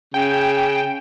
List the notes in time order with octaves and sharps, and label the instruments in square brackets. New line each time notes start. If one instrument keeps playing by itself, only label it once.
[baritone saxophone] C#3 [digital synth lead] G5